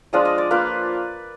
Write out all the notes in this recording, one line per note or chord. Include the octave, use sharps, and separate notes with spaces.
F3 G#3 D4 F4 D#5
D#5
D5
A#3 F4 B4